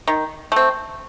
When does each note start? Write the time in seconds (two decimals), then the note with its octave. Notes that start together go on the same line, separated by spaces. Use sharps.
0.07 D#3
0.52 A3 C4